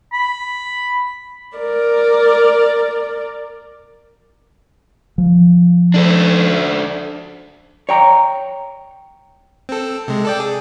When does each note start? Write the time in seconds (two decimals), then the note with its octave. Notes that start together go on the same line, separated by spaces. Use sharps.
0.13 B5
1.57 A#4 D5
5.18 F3
5.94 D4 A4 C5
7.89 C#5 G5 A#5
9.69 C4 A4
10.08 C3 G#3
10.25 A4 D5 G5
10.40 G#4